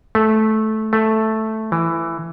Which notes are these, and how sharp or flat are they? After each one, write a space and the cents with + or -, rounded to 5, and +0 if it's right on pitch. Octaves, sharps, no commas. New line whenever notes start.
A3 -15
A3 -5
E3 +10